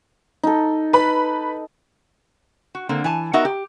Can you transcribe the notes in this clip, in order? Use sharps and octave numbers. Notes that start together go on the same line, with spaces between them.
D#4 A4
B4 B5
F#4
D3 A#3 C4
E3 G#5 A5
B3 D#4 F#4 A#4 E5 F#5
G4